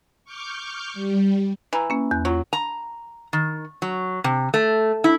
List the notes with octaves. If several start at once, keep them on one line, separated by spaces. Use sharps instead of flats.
C#6 D6 F6 G6
G3
E3 A#5 B5
A#3 C#4
E2 F#6
F#3 F4
A#5
D#3
F#3
C3
A3
E4